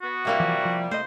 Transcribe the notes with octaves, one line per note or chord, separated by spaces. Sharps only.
B3 F#4
C3 G3 A#3 E4
E3 F3
F3
A3 C5 D#5